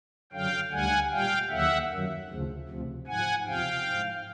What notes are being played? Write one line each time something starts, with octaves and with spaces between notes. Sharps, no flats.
F#2 D3 F#3 F5 G5
D2 D3 G3 F#5 G#5
A#2 G3 F5 G5
D#2 D3 F#3 E5 F#5
F#2 D#3 F#3
D2 C#3 F3
D2 C3 F3
G#2 F3 F#5 G#5
E2 C3 F3 F5 G5
G#2 F3